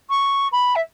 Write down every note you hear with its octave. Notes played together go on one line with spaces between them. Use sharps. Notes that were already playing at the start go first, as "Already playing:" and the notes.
C#6
B5
E5